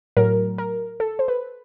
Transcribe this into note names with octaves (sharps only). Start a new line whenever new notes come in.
A2 F#3 A#4
A#4
A4
C5
B4